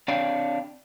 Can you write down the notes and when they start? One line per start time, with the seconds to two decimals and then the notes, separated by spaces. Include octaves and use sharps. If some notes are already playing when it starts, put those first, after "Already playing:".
0.08 C4 D4 C#5 F5 G5